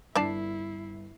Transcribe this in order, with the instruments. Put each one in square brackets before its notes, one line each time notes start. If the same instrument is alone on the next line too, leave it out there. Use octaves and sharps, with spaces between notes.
[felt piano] G1 C7 [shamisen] D4 D5 A5 [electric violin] E4